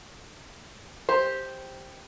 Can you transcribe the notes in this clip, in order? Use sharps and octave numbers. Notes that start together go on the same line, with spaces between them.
G4 C5